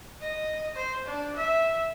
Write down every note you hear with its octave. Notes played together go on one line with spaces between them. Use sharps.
D#5
C5
D4
E5